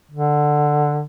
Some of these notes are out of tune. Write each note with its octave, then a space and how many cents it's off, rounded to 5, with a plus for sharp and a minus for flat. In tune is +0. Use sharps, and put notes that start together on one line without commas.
D3 +10